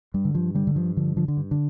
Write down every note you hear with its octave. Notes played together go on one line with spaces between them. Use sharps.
G2 G3
D3
G2 F3
D3 G3
D3
G2 F3
D3 F3
D3 F3
D3
G2
D3